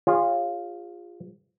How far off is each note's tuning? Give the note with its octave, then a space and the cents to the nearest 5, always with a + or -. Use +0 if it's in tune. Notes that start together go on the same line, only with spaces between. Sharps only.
F4 +0 G#4 -35 C#5 -15